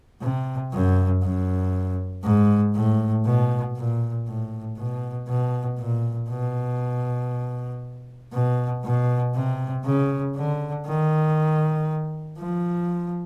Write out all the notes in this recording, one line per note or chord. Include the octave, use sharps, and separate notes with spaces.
C3
F#2
F#2
G#2
A2
B2
A#2
A2
B2
B2
A#2
B2
B2
B2
C3
C#3
D3
D#3
F3